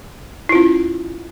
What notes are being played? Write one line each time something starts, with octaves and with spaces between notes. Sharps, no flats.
C#4 E4 F4